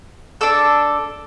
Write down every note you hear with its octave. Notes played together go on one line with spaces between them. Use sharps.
D4 A4 E6